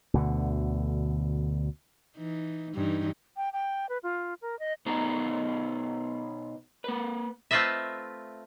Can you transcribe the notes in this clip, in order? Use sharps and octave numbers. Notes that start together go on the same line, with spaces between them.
D2 B2 D3
E3 D#4
G2 E3 D#4
G5
G5
B4
F4
A#4
D#5
B2 B3 D#4 C5 A#5
A#3 B4
A3 C4 F4 B4 D#5 E5